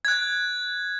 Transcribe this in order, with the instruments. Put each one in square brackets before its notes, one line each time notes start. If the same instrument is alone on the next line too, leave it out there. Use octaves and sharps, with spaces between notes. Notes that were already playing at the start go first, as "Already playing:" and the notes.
[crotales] F#6 G#6